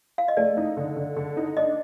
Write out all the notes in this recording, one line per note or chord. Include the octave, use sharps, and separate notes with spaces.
F5
D#5
A3 D5
D#4
D3
D3
D3
D#4
D4 D#5